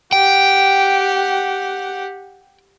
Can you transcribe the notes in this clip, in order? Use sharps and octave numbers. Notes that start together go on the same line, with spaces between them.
G4 F#5 G5